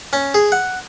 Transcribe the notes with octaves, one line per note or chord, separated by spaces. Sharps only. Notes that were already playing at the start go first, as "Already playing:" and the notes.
C#4
G#4
F#5